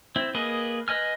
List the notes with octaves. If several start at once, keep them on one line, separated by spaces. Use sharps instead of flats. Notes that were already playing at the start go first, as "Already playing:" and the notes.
C4 E4
A#3 G#4 B4 D#5
B4 D#5 G#5 F6